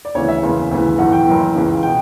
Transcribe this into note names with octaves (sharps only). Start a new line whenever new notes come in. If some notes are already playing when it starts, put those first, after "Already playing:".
D5
D2 C#3 E3 C#5
E5
F#1 E2 C#3 E3
D2 C#3 E3
B1 A2 E3 F#5
G5
F#1 F#2 E3
C#2 C#3 E3
B2 G5